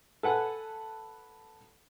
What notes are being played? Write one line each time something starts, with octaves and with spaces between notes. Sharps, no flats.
A4 B4 F#5 G#5